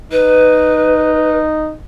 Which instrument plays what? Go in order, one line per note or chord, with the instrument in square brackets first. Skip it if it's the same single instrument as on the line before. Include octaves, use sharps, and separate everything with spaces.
[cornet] D#4 [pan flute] B4